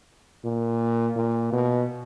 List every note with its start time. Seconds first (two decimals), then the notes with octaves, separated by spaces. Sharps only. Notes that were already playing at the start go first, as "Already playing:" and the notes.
0.44 A#2
1.16 A#2
1.52 B2